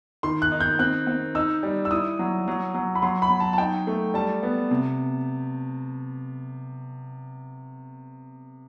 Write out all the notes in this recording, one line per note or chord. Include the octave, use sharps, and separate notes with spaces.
D#3 C6
F#6
D#4
G6
C4 F#6
C4
D#4 E6
G3
E6
E4 D#6
F#3
F#3
F#3
B5
F#3 C6
B5
F#3
A5
A5
D#4 G5
A3
G3 A5
B3
C3